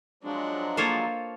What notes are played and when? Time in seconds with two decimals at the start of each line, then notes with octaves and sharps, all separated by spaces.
0.23 F3 F#3 G#3 D4 F#5
0.77 A#3 F4 A4 C5 C#5 D#5